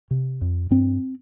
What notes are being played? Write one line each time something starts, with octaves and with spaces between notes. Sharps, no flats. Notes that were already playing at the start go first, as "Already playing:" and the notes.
C3
F2
G2 C4